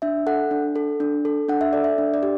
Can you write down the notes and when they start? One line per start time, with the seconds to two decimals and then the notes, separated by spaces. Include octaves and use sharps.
0.02 D4 E5
0.27 A4 F#5
0.51 D4
0.76 A4
1.00 D4
1.25 A4
1.49 D4 F#5
1.61 E5
1.73 A4 D5
1.84 E5
1.98 D4
2.14 D5
2.23 G4